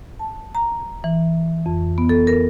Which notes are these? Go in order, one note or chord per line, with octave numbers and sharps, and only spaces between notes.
A5
A#5
E3
F2
B3
A4
A#4